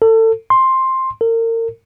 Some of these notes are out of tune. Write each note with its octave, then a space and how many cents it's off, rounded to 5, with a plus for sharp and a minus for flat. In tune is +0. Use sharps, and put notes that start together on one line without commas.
A4 +30
C6 +10
A#4 -35